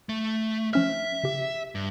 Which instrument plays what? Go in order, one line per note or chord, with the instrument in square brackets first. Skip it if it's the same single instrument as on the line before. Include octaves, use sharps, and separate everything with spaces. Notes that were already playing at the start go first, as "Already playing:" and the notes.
[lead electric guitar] A3
[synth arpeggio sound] F3 C#4 F6 [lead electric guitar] E5
[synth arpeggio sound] C#3 G4
[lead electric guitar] G2